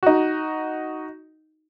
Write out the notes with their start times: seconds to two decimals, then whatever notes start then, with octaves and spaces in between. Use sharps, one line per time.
0.03 D#4 F#4